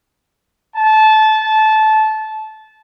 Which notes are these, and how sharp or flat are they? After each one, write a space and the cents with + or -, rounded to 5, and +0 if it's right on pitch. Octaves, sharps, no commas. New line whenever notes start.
A5 -20